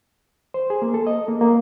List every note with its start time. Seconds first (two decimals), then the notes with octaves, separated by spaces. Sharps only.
0.54 C5
0.70 G#4
0.82 A#3
0.94 A4
1.07 D#5
1.28 A#3
1.41 A#3